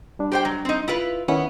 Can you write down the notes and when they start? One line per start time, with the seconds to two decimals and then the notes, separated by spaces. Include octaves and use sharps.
0.19 G3 D4
0.32 G4 C5 G5
0.45 F#3
0.65 C4 D#4
0.88 E4 F4 B4
1.28 D#3 B3 C#4 E4